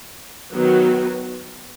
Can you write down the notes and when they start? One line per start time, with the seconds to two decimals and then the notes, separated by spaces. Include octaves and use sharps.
0.52 D#3 F#3 B3 F#4